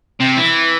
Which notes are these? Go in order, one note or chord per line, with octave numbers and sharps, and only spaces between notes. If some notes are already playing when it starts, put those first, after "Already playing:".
C3
E3